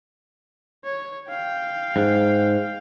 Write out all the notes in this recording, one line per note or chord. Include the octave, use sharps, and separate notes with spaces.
C#5
F5 G5
G#2